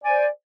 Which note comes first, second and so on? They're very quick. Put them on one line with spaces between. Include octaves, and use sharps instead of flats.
D5 G#5 C5